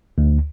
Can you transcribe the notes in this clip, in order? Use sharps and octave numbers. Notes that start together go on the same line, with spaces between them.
D2